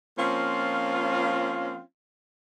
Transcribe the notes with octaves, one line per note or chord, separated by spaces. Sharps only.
F3 A#3 C4 C#4 F4